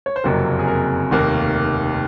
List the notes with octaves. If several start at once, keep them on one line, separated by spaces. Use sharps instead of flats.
C#5
C5
F#1 F2 C3 F#3 A#3 A#4
G#4
A#4
F1 D#2 D#3 A#3